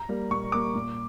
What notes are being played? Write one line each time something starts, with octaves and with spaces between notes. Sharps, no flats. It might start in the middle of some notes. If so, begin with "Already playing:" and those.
Already playing: A#5
G3 A#3
A#2 C#6
G3 A#3 D6
A#2